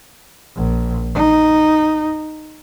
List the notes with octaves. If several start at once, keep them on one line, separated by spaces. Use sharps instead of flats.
A#1
D#4